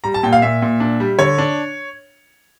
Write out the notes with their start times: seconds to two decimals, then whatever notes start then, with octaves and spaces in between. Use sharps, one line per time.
0.04 G3 A#5
0.14 A5
0.23 A#2 G5
0.33 F5
0.42 A#2 E5
0.62 A#2
0.80 D4
1.00 G3
1.19 D3 C#5
1.38 D4